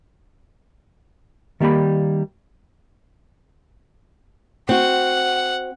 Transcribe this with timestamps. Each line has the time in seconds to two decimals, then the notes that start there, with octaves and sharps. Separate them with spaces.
1.60 D#3 G3 A#3 G4 B5
4.69 C4 F#4 F#5